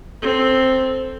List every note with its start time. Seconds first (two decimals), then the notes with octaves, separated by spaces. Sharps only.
0.22 C4 A4